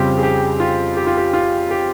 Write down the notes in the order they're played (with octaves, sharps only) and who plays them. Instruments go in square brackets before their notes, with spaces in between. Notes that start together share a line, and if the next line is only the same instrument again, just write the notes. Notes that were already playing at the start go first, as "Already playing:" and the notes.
Already playing: [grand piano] F2 C#3 G3 C4 G4
G#4
G4
F4
G4
F4
G4
F4
G4